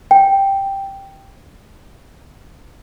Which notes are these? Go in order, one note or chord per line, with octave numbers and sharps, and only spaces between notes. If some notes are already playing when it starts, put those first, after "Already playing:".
G5